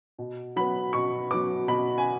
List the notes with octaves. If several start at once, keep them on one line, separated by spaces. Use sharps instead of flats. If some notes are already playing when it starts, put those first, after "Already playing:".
B2
F#3 B3 B5
B2 C#6
F#3 B3 D6
B2 B5
G#5